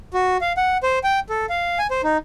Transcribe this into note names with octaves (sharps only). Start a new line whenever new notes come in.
F#4
F5
F#5
C5
G5
A4
F5
G#5
C5
D#4